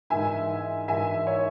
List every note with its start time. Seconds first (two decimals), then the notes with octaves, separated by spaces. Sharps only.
0.10 G#2 E3 A#3 E5 G#5
0.88 G#2 E3 A#3 E5 G#5
1.27 C#5 E5